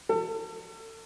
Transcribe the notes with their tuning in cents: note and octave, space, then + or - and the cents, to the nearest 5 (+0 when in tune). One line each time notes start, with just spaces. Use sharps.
A4 +35